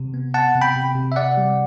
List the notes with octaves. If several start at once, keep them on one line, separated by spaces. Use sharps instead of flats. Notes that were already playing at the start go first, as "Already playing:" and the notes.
Already playing: C3
B3
B3 F#5 A5
C3
G5 B5
C3
C3
E5
C3 D5 F#5
G3